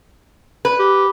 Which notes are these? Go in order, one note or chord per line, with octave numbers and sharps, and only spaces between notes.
B4
G4